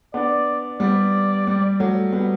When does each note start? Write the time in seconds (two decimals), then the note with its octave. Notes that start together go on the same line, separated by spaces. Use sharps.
0.14 B3 D4 D5
0.80 G3 B3 D5
1.47 G3
1.80 F#3 A3
2.13 G3 B3